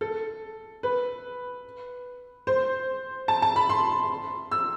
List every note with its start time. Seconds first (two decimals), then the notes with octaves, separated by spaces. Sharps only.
0.01 A4
0.83 B4
2.47 C5
3.28 A5
3.42 A5
3.56 B5
3.69 C6
4.51 E6